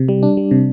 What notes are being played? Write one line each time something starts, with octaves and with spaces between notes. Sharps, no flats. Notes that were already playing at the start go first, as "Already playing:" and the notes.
Already playing: C3
G3
D4
G3
C3